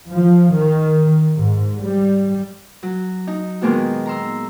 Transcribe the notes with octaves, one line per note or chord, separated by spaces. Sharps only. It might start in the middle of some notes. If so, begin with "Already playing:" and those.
F3
D#3
G#2
G3
F#3
D#4
A#2 D#3 G#3 A#3 B3 F#4
A#5 C6 E6